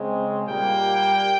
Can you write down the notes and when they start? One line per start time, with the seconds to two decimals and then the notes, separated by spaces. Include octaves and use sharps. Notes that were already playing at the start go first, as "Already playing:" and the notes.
Already playing: C#3 G#3 C4
0.47 A#2 G3 A#3 G5